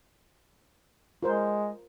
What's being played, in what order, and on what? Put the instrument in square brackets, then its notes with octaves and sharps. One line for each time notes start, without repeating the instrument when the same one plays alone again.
[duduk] G#3 [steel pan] F4 A#4 C5